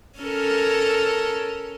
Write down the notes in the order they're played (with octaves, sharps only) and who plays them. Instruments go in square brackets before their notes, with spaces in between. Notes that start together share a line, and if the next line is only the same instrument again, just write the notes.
[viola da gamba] C#4 A4 A#4